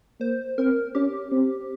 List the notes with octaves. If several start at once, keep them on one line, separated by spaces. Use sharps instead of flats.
A#3 C5
C4 A#4
C#4 G4
C4